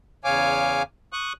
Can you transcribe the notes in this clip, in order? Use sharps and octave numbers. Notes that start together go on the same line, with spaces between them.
E2 C#3 C#5 F5 G#5 D6
C#6 D#6 F#6